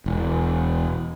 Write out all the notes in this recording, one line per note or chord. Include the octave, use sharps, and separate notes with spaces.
E1